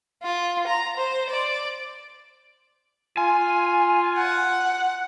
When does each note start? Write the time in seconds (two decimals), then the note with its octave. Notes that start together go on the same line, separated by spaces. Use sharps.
0.23 F4
0.67 A#5
0.97 C5
1.30 D5
3.17 F4 G#5
4.18 F#5